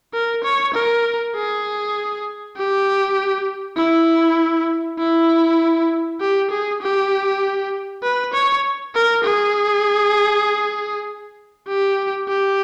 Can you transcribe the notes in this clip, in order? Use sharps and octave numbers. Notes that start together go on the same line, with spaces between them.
A#4
C#5
A#4
G#4
G4
E4
E4
G4
G#4
G4
B4
C#5
A#4
G#4
G4
G4